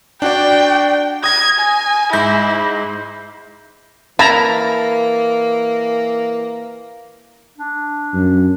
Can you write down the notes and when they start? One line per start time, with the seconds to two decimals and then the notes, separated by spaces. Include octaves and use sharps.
0.22 D4 F#4 D5 G5
1.24 D#6 G#6 A#6
1.60 G#5
2.13 G#2 E4 G6 A#6
4.19 E3 A#3 E4 A5 A#5
7.58 D4
8.14 F#2